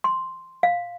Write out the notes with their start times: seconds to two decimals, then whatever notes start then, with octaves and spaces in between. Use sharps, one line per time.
0.04 C6
0.63 F5